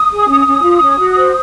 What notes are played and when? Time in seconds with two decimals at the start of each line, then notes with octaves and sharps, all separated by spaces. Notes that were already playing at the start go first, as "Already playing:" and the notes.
Already playing: D#6
0.11 G#4
0.28 C#4
0.46 C#4
0.63 F4
0.82 C#4
0.98 F#4
1.16 C5